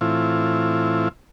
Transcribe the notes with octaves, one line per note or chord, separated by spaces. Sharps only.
A2 E3 C4 E4 F4